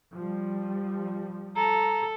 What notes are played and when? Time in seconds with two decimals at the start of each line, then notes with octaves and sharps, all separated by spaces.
0.15 F3 G3
1.56 A4 A#5